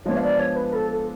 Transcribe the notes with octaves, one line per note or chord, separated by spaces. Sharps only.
F3 G#3 B3 D4 C#5
F5
D5
C#5
B4
A4
A4